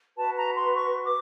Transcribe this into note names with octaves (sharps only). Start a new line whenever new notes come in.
F#4 B4 A5
A#5
C6
C#6
D6